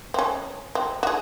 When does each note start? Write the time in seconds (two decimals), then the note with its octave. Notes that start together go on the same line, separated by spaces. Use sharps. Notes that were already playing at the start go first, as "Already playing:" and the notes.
0.14 C4 C#4
0.75 C4
1.03 F#4 G#4